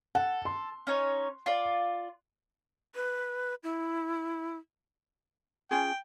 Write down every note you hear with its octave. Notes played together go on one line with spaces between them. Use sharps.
A4 F#5
C6
C#4 D#4 C#5
F4 D5
B4
E4
C#4 F4 G#4 G5